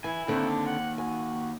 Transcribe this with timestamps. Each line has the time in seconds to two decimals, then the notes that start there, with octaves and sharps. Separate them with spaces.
0.04 E3 E4 G#5
0.28 D#2 D3 C4
0.49 D4
0.66 F#5
0.98 F#4 G#5